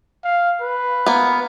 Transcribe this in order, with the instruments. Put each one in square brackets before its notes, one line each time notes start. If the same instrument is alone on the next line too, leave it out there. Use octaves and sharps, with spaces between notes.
[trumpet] F5
B4
[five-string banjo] A#3 B3